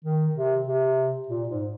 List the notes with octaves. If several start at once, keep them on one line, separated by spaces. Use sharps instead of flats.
D#3
C3
C3
A#2
G#2